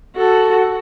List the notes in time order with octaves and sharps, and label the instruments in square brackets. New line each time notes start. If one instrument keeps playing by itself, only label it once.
[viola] F#4 A4